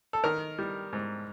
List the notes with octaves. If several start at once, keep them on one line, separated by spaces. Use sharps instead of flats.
A4
D#3 A#4
G3
G#2